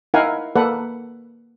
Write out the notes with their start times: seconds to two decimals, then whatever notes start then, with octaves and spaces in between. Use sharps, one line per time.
0.14 D#4 E4 A#4 F5 F#5 G#5
0.56 A#3 A4 B4 D5 F#5